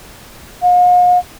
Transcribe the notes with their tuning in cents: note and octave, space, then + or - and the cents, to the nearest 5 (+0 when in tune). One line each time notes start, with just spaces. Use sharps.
F5 +45